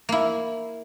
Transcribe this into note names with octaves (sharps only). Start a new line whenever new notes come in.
A#3 E4